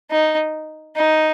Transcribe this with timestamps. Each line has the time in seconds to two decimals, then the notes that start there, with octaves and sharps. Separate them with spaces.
0.11 D#4
0.96 D#4